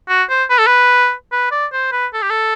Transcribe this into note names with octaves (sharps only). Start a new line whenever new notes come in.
F#4
C5
B4
A4
B4
B4
D5
C5
B4
A4
G4
A4